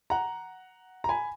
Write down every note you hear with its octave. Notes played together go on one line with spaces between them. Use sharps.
F#5 A#5
A#5
G#5 B5